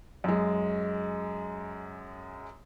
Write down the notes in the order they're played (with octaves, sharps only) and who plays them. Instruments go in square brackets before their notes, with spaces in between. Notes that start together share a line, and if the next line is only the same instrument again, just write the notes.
[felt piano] F#2 G#3